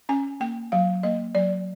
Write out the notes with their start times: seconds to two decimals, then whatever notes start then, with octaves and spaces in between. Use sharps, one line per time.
0.09 C#4 G#5
0.40 A#3 G5
0.72 F#3 F5
1.03 A#3 D#5
1.35 F#3 D5